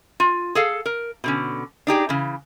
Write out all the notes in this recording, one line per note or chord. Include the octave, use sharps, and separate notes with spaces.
F4
G#4 A4 F5
A#4
B2 D3 C#4
D4 D#4 G4 G#4
C#3 E3